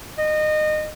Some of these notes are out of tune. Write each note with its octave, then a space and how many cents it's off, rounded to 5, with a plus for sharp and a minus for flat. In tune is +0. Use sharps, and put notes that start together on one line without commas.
D#5 -25